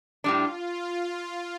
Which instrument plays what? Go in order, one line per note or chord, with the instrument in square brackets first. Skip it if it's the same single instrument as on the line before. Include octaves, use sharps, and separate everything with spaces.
[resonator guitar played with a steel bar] A2 G3 D4 [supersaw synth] F4